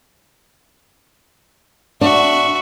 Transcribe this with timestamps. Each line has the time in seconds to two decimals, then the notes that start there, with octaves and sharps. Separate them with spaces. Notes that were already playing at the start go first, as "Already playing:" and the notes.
2.01 D4 F#4 E5